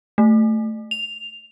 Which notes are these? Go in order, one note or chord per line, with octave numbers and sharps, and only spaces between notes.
A3
F7